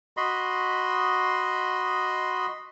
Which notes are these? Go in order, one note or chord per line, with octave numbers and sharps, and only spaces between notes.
F#4 D#5 B5 C6